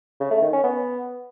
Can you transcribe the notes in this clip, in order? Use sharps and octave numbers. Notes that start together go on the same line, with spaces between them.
C#3
A3
D#3
C#4
B3